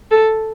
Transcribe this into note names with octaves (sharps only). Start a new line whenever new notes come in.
A4